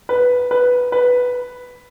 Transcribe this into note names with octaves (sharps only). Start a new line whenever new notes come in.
B4
B4
B4